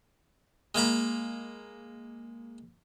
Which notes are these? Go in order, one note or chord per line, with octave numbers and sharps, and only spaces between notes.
G#3 A#3 A#5 B5